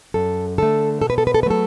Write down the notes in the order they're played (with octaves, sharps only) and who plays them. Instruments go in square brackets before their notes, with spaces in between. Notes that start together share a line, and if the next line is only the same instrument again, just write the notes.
[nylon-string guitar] F#2 A4
D3 A3 A4
B2 A4
B4
A4
B4
A4
B4
F#3 A3 A4